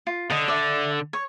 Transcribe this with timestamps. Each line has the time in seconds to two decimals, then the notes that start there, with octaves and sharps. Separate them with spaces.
0.07 F4
0.30 D3 D#5
0.48 D5 E5
1.13 C#5